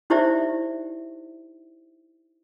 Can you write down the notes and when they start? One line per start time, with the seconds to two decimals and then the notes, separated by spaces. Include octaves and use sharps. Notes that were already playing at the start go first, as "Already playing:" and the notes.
0.10 D#4 E4 G4 C5 D5 E5